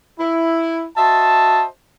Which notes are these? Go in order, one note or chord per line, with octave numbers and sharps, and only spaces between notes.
E4
F#4 C5 D#5 E5 A5